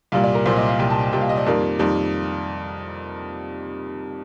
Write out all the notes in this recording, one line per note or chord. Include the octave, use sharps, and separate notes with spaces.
C2 A#2 G3 F5
D5
A#4
C2 A#2 G3 C5
D#5
F5
C2 A#2 G3 G5
A5
G5
C2 A#2 G3 G5
F5
D#5
D5
F2 D#3 G3 A#3
F2 D#3 G3 A#3